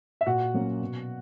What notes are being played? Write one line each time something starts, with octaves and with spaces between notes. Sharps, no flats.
E5
A#2 F#4 F#5
F#3 A#3 C#4
B2